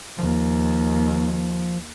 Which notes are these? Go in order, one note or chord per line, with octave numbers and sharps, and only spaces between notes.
D#2 F3